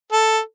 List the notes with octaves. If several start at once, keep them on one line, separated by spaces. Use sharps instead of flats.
A4